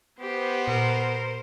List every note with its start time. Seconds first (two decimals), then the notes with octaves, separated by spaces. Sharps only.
0.21 B3 G4 C5
0.68 A#2 A#4